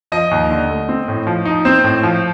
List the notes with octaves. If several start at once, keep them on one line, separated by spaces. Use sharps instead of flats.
F3 D#5
D#2
D3
A3
C4
A2
F3
D#4
C4 C5
A2
F3